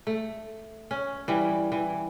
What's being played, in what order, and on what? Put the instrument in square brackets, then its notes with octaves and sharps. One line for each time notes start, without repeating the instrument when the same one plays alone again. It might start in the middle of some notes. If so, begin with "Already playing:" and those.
[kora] A3
C#4
E3 G3
E3